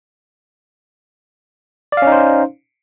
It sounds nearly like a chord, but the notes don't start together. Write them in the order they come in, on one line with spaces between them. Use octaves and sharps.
D5 F5 C#4 D#4 C5